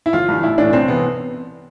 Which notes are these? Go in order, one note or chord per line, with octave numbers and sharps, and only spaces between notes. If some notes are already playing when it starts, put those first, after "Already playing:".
E4
G1 F4
G2 E3
A1 E4
A2 E3 D4
C2 C4
C3 E3 B3